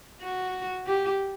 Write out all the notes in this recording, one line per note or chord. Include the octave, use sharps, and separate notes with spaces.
F#4
G4